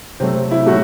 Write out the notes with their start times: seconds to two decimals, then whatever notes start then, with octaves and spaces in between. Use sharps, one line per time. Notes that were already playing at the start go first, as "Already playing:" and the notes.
0.20 C3 F#3 A3 C4
0.51 E4
0.66 A2 F#3 A3 F#4